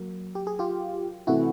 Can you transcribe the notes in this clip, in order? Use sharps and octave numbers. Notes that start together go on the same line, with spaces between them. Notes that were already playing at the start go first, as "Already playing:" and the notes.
Already playing: F#3 A#3
G4
G#4
F4 G4
C3 E3 A3 E4 F#4